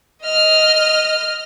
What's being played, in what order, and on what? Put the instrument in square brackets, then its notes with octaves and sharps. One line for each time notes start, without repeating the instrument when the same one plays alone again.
[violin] D#5 F6